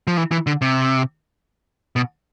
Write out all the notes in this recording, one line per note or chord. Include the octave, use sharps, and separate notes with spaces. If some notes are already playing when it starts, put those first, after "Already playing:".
F3
E3
E3
D3
C3
B2